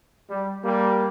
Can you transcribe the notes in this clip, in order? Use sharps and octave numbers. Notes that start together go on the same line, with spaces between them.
G3
G3 A#3